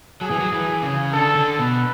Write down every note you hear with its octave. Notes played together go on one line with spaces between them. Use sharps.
F#3 G#4
E3
F#3
E3
C#3
D3 A4
D3
B2 B4